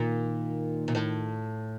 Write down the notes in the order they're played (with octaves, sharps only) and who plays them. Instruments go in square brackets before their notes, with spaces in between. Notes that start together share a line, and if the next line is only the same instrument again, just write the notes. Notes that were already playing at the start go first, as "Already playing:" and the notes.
Already playing: [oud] A#2 [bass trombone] D#3
[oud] A#2
A2